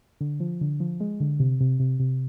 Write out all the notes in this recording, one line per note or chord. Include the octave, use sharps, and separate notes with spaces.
D3
F3
D3
F3
G#3
D3
C3
C3
C3
C3